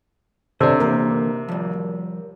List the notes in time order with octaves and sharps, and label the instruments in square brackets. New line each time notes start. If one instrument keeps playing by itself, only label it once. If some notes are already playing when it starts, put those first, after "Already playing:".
[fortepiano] C3 [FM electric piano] D4 A4 [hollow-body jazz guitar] C5 C#5
[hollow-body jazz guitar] D3 E3 A#3 [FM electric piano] A#4
[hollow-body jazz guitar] F3 G3